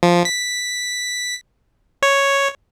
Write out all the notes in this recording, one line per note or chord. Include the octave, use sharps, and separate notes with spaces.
F3
B6
C#5